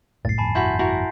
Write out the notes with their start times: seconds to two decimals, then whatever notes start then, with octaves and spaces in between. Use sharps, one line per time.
0.25 G1 C2 F#2 A2 A6 C7
0.38 G1 F2 G#5 A5 B5
0.55 E4 F#4 B5 C6 G6 B6
0.79 E4 F#4 A#4